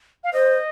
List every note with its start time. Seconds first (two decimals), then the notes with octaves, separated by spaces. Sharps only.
0.24 F5
0.33 C5 D#5